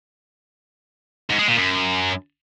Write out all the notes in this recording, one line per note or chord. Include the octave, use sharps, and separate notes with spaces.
G#2
G#3
A#2
F#2